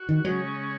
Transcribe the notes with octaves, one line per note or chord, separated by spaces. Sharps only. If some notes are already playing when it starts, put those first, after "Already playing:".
Already playing: F#4
D#3
C#3 F#3 G#3 C#4